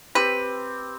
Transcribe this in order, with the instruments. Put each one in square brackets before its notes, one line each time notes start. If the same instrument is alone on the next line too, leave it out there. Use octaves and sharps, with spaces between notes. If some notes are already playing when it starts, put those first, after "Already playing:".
[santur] C4 G4 [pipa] B4